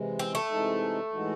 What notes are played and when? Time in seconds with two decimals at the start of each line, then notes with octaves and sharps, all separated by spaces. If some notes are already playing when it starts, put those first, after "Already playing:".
Already playing: C3 E3 G#3
0.19 C4
0.35 A3
0.50 C3 E3 G#3 D#4 A4
1.12 A2 E3 G#3 D#4 F#4